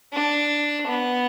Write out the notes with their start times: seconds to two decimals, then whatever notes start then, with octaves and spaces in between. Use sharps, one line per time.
0.13 D4
0.87 B3